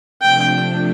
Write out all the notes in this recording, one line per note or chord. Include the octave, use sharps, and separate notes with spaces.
C3 F3 A3 D4 G5